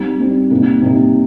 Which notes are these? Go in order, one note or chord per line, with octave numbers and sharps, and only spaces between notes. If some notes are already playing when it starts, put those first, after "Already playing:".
Already playing: G3 C4 D#4
G3 C4 D#4
C3 G3 A#3 D#4
C3 G3 A#3 D#4